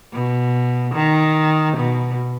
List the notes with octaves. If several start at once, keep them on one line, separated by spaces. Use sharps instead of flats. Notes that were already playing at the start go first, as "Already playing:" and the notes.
B2
D#3
B2